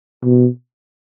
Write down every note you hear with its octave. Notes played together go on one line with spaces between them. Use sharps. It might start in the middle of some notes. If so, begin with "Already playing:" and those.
B2